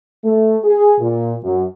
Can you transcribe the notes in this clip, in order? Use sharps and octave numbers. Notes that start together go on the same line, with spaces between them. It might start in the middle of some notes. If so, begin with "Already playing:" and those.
A3
G#4
A#2
F#2